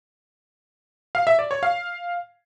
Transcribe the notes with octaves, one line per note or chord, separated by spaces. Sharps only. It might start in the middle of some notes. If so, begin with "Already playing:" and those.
F5
E5
D5
C#5
F5